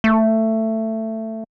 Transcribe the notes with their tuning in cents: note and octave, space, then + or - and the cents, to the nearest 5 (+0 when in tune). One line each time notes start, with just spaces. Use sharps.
A3 +15